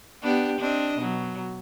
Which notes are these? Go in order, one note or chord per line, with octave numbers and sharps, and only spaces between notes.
B3 D4 G4
C4 D4 D#5
B2 F#3